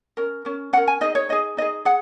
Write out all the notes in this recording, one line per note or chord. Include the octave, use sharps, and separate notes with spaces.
C#4 A#4
C#4 A#4
C#4 A#4 F#5
G#5
D#4 G#4 D#5
C#5
D#4 G#4 D#5
D#4 G#4 D#5
G#4 F#5